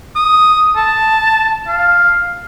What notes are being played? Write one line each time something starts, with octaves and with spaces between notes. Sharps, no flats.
D#6
A5
F5